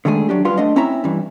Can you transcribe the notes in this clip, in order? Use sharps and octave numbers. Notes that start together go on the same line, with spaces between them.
D3 D#3 G#3 A3 G#4
F#3 D4 G4
F#2 G3 F4 B4 F5 C6
A3 D4 D#5 F#5
C4 C#4 E4 E5 A#5
G2 E3